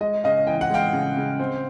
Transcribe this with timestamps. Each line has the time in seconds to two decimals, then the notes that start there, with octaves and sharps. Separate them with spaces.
0.01 G#3 D#5
0.24 C#3 D#5 F5
0.47 E3 G5
0.61 F#5
0.70 G#3 F5 G5
0.93 C#3
1.17 C#3
1.39 C4